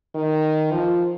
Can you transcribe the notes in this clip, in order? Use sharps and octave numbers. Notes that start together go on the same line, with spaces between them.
D#3
F3